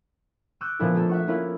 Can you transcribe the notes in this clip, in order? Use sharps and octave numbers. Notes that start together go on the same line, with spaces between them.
C#6 D6 E6 F#6 G6 D#7
A#2 F3 B3 D4 E4 A4
A3 A#3 F4 A4
E5 F#5 C#6
A#3 C#4 E4 F4